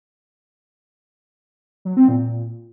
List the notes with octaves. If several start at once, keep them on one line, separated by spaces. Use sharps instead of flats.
F#3
C4
A#2